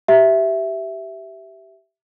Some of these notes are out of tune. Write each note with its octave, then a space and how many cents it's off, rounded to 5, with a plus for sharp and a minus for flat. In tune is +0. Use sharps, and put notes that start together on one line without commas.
G4 -15 E5 +0